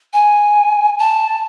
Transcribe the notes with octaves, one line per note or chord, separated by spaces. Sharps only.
G#5
A5